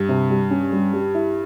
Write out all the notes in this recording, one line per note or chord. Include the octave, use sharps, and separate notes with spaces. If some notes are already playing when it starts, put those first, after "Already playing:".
Already playing: G2
C3
G3
C#4
G3
G3
E4